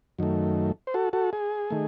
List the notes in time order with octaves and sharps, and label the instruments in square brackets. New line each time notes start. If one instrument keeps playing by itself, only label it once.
[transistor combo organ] F#2 D#3 A3
C5
F#4 A4
F#4 A4
G#4
D#3 A3